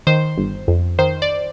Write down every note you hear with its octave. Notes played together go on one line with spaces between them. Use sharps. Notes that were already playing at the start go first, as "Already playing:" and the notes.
D#3 C5
G1
F2
D#3 C5
D5